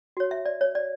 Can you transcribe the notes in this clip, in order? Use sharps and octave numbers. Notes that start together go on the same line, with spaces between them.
F#4 C#5
E5
D5
C#5
D5